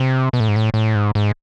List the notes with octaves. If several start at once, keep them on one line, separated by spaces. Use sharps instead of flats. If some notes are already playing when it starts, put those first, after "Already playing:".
Already playing: C3
B2
A2
G#2
A2
A2
G#2
G#2